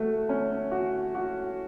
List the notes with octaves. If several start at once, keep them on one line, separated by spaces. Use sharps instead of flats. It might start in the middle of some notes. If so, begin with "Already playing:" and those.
Already playing: A3 F#4
C#4
F#4
F#4